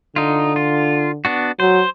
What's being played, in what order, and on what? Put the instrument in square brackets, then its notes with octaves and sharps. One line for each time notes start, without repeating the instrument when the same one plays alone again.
[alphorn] D3 [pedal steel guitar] D#4 F4
[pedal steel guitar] F4
B3 D4 F#4
[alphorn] F#3 [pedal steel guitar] C5